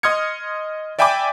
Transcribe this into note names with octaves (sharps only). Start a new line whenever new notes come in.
D#5 C6 D#6 F6 G#6 C#7
D5 E5 G5 G#5 B5 D6